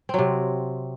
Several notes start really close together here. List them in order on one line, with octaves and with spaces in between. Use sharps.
C4 F#3 C3